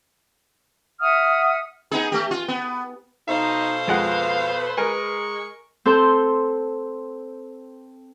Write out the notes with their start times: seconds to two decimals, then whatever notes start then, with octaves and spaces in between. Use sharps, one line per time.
1.00 E5 F#5 D#6 F6
1.91 B3 D#4 G#4
2.12 A3 G4
2.31 F4
2.48 B3
3.28 B2 D#4 A4 C5 F5
3.88 F2 G#3 B4 F#5
4.78 G#3 A#4 G#5 C#6
5.85 C4 A4 C6 G6